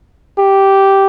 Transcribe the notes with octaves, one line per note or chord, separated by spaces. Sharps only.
G4